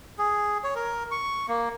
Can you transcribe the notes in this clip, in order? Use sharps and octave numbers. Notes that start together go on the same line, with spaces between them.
G#4
C#5
A#4
C#6
A#3